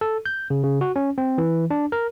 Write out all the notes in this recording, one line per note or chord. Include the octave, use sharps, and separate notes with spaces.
A4
G6
C#3
C#3
F#4
C#4
C4
E3
D4
A#4